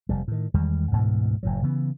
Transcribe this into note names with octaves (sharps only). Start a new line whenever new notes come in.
F1 G3
A2 D#3
E2 D#3 G3 G#3
D2 G#2 B2 E3
F#1 A2 F#3
C#3 E3 B3